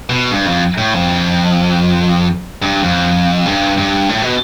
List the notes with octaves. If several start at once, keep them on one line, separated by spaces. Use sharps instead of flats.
B2
G2
F2
A2
F2
G2
F2
G2
G2
A2
B2